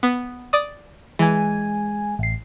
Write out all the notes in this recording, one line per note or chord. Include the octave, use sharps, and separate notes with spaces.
B3
D5 D#6
E3 G#3 G#5
A1 C7